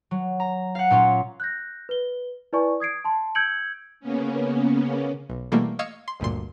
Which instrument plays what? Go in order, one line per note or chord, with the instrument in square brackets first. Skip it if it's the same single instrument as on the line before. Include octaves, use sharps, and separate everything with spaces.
[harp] F#3
A#5
F5 F#5
A#2 C#4 F4
[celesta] F#6 G6 A#6
B4 G7
E4 B4 D5 G#5 C#6
D#6 G#6 C7 D7
A5 C6
E6 G6 G#6 C#7 D7 F#7
[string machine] C#3 A#3 B3 C#4
[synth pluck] B1
B2 E3 G3 A3 A#3
D#5 F5 C#6 E6 G#6 C#7
C6
G1 D2 G2 A#2 C6